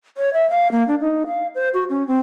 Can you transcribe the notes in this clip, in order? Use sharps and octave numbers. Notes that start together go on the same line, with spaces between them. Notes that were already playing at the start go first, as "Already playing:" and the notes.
C#5
E5
F5
A#3
D4
D#4
F5
C5
F#4
C#4
C4